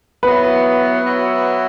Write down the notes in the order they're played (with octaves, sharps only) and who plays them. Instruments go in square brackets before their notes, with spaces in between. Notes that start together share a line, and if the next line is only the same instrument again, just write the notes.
[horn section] F#3 B3 E4 [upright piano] B4
[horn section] F#3 B3 E4